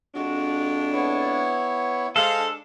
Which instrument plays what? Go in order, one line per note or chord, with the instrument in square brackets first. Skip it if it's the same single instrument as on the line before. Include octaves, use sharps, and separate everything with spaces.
[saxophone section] F2 G#3 D4 [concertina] F#4
[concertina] B3 E4 C#5
[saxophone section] G#3 C5 F5 [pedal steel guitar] A4
[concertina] D4